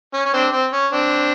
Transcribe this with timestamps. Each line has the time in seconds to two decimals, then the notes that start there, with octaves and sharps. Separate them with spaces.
0.14 C#4
0.26 C#4
0.33 C4 D4
0.52 C4
0.73 C#4
0.92 C4 D4